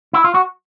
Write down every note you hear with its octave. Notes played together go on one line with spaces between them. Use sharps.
E4
F4
F#4